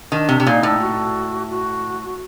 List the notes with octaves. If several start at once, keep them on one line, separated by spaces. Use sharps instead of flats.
D#3 D4
C3
C3
A#2 D#4
A2
F#4
F#4